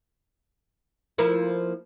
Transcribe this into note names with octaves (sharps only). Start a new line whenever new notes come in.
F3 A#3 E4